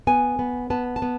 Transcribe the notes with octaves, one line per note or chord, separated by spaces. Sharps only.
B3 G#5
B3
B3 A5
A5
B3